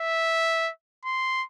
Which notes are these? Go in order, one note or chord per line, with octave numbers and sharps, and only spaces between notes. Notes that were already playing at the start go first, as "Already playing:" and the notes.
Already playing: E5
C6